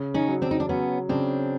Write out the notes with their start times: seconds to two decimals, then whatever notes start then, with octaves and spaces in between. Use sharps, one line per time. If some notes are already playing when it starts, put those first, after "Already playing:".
Already playing: C#3
0.14 C#4 D#4
0.28 F#3
0.42 C4 D4
0.51 D#4
0.60 D4
0.69 F#3 B3 C#4
1.09 C#3 C4 D4